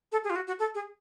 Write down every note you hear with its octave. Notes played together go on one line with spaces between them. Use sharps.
A4
G#4
F4
F#4
F#4
A4
G#4